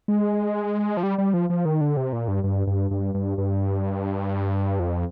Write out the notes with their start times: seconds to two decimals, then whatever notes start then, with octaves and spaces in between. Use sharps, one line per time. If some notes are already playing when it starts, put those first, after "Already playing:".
0.08 G#3
0.97 F3
1.03 G3
1.18 G3
1.34 F3
1.50 F3
1.65 D#3
1.81 D3
1.97 C3
2.13 A#2
2.28 G2
2.44 G2
2.67 G2
2.91 G2
3.14 G2
3.38 G2
4.80 F2